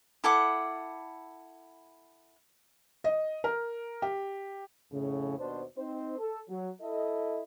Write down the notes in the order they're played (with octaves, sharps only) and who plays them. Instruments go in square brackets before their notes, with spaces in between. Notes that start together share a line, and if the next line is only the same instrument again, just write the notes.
[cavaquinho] E4 A4 F#5 D6
[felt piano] D#5
A#4
G4
[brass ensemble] F2 A2 C#3
D#2 B2 D4 C5
C4 D#4 C5
A4
F#3
E4 A4 D#5